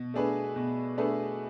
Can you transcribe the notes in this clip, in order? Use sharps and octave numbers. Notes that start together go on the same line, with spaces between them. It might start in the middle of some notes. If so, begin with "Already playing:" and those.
Already playing: B2
A3 D4 G#4 B4
B2
A3 D4 G#4 B4